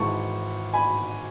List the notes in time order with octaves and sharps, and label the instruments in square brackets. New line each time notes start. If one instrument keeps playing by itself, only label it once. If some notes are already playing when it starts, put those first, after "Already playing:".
Already playing: [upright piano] G#1 G#2 E3 A5 C#6
G#5 B5